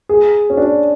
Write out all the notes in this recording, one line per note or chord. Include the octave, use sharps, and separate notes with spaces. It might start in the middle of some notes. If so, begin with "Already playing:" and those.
G#4
C#4
D4